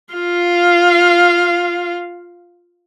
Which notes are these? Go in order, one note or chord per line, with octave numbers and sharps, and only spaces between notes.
F4 F5